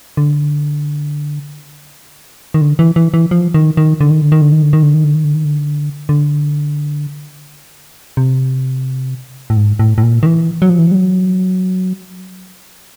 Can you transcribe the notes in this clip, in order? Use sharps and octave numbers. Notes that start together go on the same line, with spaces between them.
D3
D#3
D3
E3
E3
E3
F3
D#3
D#3
D3
D#3
D3
D#3
D3
D#3
D3
D#3
D3
D#3
D3
D#3
D3
D#3
D3
D3
C3
A2
G#2
A2
A2
A#2
D#3
E3
F#3
F3
E3
F3
G3
F#3